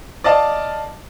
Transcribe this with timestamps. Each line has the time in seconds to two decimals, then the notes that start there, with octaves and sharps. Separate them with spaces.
0.24 D5 D#5 F5 A5